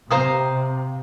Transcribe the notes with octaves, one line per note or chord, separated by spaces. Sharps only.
C3 C5 F5 A#5 D#6